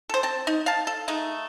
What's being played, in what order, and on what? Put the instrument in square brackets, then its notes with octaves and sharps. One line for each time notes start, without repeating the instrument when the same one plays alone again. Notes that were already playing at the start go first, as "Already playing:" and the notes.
[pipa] A4 C5
C4 A5
D#4
F5 A5
A4
G#3 A3 D#4